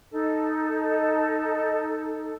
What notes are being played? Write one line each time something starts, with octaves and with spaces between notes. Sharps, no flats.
D#4 A4